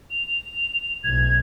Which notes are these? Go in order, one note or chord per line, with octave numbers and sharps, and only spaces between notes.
F7
B1 A2 G#6